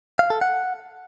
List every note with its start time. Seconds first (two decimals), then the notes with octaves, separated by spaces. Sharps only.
0.19 F5
0.30 A4
0.41 F#5